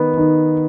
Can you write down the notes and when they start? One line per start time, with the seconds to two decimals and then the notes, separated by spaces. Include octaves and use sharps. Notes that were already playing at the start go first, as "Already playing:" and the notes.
Already playing: D#3 B3
0.17 D#3